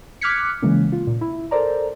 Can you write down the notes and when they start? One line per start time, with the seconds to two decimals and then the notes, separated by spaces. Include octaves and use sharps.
0.21 D6 F6 F#6 G#6 B6 C#7
0.62 C#3 E3 G#3 A#3 C#4
0.92 F4
1.07 A#2
1.21 E4
1.51 A4 A#4 C5 D5 A#5